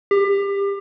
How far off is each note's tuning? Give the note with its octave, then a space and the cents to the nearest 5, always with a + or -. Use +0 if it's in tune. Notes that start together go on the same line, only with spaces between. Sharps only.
G4 +30